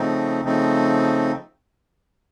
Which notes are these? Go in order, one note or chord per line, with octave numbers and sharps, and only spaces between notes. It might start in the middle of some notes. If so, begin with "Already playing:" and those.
Already playing: C#3 F3 A3 C4 D#4
C#3 F3 A3 C4 D#4